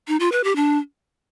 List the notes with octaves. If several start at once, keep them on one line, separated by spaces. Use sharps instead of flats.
D#4
F4
B4
G4
D4